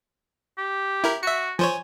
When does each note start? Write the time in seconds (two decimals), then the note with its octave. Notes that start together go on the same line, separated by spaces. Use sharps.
0.58 G4
1.04 E4 A#4
1.23 F#4 E5 C#7
1.59 F3 C5 C#5 G#5